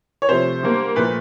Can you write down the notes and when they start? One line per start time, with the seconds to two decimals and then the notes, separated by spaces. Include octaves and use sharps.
0.22 C#5
0.29 C3 F3 A3 C5
0.63 D3 G3 A#3
0.96 A#2 F3 A3 B4